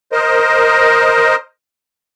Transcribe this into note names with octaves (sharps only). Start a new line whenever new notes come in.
A#4 C5 D#5